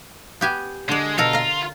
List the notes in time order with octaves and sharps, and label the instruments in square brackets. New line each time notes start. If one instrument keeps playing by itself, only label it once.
[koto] B3 G4 G#5
[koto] D3 D5 [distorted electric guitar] G#3
[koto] B2 A4 A#4 [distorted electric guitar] F4
[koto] F5 A#5